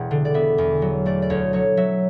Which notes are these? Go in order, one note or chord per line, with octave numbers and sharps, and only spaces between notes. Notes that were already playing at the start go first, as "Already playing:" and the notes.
Already playing: E1 F#5
D3
D5
B3 E5
E2
F#3
A3 D5
D5
D2 C#5
F#3 C#5
F#3 E5